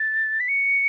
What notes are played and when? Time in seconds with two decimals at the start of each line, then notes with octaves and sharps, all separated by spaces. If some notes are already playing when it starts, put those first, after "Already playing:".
Already playing: A6
0.40 B6
0.48 C#7